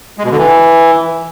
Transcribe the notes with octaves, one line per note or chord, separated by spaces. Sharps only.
G#3
B2
D3
E3